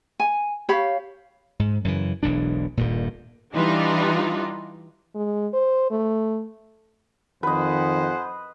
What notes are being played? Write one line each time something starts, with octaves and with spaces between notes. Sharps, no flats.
G#5
G4 C#5 F5 B5
G#2
F#2 C#3 E3
E1 B1 E3 D4
D#1 G2 A#2
E3 G3 D4 D#4 F4
G#3
C5
A3
F2 D#3 B4 C5 D#5 F#5 G#5